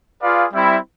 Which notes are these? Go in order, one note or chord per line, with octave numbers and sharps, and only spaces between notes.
F4 G#4 B4 D5 F5
G3 C4 E4